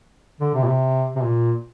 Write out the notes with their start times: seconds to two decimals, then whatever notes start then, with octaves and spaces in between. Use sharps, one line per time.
0.41 D3
0.54 C3
0.64 A#2
0.68 C3
1.16 C3
1.23 A#2